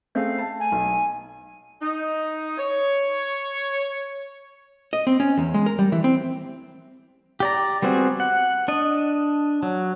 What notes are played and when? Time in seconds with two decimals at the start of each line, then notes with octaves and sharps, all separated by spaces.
0.15 A3 C4 G#4 F5
0.38 A5
0.60 G#5
0.72 B1
1.82 D#4
2.58 C#5
4.93 D#5
5.07 C4
5.20 C#4
5.38 E2
5.54 G#3
5.66 A#4
5.79 G3
5.92 E3
6.04 C4
7.40 G4 D5 A#5
7.82 G3 B3 C4 F#4 G#4
8.20 F#5
8.68 D4 D#5
9.63 F#3